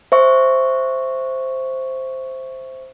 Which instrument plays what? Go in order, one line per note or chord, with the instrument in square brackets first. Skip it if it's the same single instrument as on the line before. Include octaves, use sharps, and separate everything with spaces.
[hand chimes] C5 E5 C#6